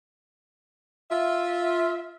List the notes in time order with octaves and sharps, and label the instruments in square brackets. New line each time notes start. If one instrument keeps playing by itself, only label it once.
[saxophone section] F4 E5